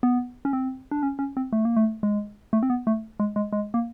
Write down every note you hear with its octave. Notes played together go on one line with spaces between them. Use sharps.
B3
C#4
C4
D4
C#4
C#4
C4
A3
A#3
A3
G#3
A3
C4
B3
A3
G#3
G#3
G#3
A#3